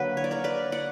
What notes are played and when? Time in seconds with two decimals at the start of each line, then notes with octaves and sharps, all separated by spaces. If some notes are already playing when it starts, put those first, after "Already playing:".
Already playing: D3 F#3 A#3 B4
0.17 C#5
0.24 D5
0.31 A#4 C#5
0.44 B4 D5
0.72 D5 F#5